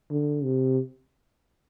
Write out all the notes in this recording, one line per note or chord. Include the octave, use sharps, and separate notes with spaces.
D3
C3